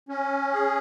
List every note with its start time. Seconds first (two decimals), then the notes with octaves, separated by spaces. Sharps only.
0.09 C#4
0.53 G#4